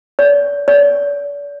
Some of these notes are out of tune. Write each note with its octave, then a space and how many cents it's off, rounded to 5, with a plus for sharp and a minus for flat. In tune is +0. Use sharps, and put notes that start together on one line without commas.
D5 -40
D5 -40